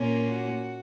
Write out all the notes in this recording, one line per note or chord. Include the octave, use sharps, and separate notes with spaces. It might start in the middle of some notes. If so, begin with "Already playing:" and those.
Already playing: A#2 A#3 C#4 A#4
F#4